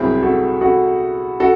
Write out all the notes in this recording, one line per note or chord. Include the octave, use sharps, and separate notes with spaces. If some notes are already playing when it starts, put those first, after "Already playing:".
Already playing: C2 C3 F#3 C4 E4 G#4
F#4 A4
F#4 A4
F#4 A4